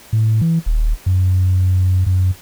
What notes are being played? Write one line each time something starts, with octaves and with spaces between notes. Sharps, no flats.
A2
E3
D#1
F#2
F#2